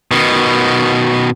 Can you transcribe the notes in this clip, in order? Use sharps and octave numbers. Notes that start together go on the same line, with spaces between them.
B2 D#3